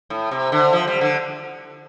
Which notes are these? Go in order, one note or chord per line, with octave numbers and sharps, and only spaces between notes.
A2
C3
D3
F3
G3
D3